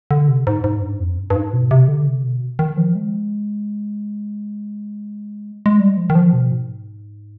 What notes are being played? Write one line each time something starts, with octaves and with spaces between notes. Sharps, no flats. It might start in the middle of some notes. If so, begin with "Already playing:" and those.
D3
C3
G#2
G#2
G2
F2
G2
G2
G#2
B2
C3
D3
C3
B2
D#3
F3
G#3
G#3
G3
F3
D#3
F3
B2
G#2